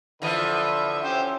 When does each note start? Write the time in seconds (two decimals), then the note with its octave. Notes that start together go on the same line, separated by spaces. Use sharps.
0.22 D3 E3 F3 B4 E5
1.04 C#4 G4 C5